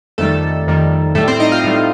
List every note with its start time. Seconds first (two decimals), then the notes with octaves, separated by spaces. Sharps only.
0.18 F2 D#3 G3 A3 A4
0.67 F2 D#3 G3
1.15 A2 G3 A3 A4
1.28 C4 C5
1.40 D#4 D#5
1.52 F4 F5
1.64 A2 G3